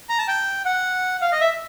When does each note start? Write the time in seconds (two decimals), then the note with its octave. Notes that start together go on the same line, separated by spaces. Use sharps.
0.09 A#5
0.19 A5
0.28 G5
0.65 F#5
1.21 F5
1.32 D#5
1.41 E5